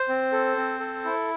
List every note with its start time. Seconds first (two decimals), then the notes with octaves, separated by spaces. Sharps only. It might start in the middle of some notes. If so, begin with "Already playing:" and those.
Already playing: C5
0.09 C4
0.32 A4
0.57 C4
0.80 A4
1.05 E4